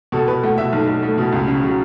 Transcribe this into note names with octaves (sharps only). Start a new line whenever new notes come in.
B2 A4
B2 B4
A3 F#5
B2 E5
B1
B1
A3
B2
C#2
C#3
F#3